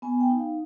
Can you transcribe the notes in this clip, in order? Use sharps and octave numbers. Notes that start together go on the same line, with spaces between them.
B3 G#5
G5
D#4
F5